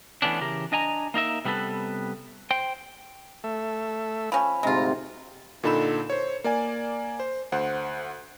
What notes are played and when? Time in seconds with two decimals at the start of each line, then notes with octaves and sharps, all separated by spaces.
0.22 E3 A3 B3 C#4 D4
0.40 C#3 E3 G4 A#4
0.72 D4 D#5 G#5 A#5
1.14 A#3 D#4 A#4 E5
1.45 C3 G3 B3 D#4 A4 B4
2.51 C5 G5
3.44 A3 E5
4.32 F3 C#4 G#5 B5
4.63 D2 G#2 C3 G#3 F4 A#5
5.63 A#2 D3 D#4 A4 B5 E7
6.10 C5 C#5
6.44 A#3 D5 G#5
7.20 C5
7.52 D2 C5 F#5 F#6